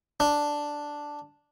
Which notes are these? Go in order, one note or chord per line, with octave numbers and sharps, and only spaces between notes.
D4